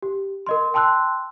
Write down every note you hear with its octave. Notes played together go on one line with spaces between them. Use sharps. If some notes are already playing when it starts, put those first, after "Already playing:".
G4
A#4 D#5 C6
G5 A5 C6 E6 F#6